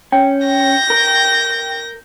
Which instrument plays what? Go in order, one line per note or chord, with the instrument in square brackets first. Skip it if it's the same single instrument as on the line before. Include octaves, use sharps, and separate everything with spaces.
[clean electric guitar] C#4 [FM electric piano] G5
[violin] G6 A#6
[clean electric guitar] A#4